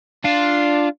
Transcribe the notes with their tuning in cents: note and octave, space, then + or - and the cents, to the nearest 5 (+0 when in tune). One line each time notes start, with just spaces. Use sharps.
D4 +0 F4 +0